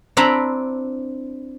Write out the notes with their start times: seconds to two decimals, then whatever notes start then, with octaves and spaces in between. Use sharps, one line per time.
0.17 C4 D4 E4 A#5 B5